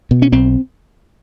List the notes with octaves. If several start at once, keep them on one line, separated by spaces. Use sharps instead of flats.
B2
C#4
B1 C4